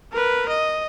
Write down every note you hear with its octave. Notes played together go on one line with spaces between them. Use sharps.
A#4 B4
D#5